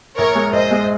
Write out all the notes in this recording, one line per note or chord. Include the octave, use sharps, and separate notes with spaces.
A#1 A#4 C#5
G#3
A#1 C5 D#5
G#3